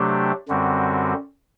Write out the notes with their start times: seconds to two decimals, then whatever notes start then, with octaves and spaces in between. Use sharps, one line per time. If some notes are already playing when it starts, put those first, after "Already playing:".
Already playing: C3 F#3 A3 D4 G4
0.48 F#2 D3 G3 C4 F#4